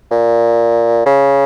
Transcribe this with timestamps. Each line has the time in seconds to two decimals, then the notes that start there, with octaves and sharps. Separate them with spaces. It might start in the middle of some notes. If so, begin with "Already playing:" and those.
0.11 A#2
1.06 C#3